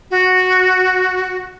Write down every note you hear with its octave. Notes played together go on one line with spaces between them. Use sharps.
F#4